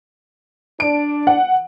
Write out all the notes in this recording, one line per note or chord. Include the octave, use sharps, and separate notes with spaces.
D4 D7
F#5